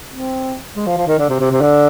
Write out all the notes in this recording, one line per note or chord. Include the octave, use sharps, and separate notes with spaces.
C4
G#3
F3
F3
D#3
D3
C3
C3
C3
D3